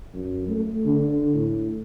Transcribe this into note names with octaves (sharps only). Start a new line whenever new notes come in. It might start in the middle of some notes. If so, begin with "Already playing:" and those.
F#2
A3
D3
A2